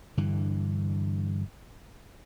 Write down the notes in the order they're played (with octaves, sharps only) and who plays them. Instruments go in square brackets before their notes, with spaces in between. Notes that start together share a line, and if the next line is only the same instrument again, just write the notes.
[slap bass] G2 D3 E3